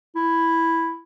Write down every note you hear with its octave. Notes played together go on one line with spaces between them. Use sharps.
E4